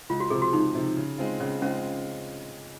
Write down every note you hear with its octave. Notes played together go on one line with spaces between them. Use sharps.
C#2 F4
F#4
C3 F3 G#4
F#4
C#2 D#4
C3 F3
C#3
G#3 C4 F4
C#3 C#4
G#3 C4 C#4 F4